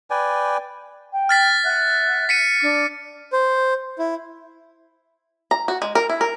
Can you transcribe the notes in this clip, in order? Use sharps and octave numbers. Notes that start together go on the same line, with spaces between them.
B4 D5 G5 G#5
G5
F6 A6 B6
E5 F#5 F#6
B6 C#7 D#7
D4 D6
C5
E4
A#5
F#4
G#3
A#4
E4
A#4